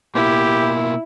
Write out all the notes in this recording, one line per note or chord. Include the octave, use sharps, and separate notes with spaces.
B2 A#3 E4 G4